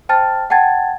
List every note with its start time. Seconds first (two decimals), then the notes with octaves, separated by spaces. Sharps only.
0.09 C5 G5 A5 F6 A6
0.50 F#5 G5 A5 G#6 A6